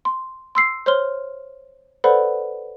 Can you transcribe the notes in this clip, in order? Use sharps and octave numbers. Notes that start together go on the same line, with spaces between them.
C6
C6 E6 C7
C5 C#5 C6 F6 G7
A4 B4 C5 D5 F#5 B5